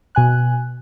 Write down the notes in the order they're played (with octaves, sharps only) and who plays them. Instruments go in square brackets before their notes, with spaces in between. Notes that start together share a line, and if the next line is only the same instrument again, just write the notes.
[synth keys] B2 G#5 F#6